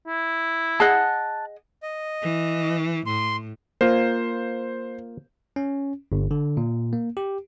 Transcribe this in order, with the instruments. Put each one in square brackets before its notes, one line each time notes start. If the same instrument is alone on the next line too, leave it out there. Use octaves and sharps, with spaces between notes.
[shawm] E4
[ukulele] G#4 D#5 F#5 [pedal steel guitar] A5 F#6
[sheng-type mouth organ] D#5
[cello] E3
[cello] A2 [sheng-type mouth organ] C6
[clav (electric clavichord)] A#3 F4 [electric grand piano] C5
[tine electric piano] C#4
G1
D3
A#2
A#3
G4